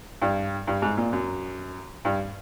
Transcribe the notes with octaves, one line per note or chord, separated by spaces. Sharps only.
G2
G2
G#2
A#2
F#2
G2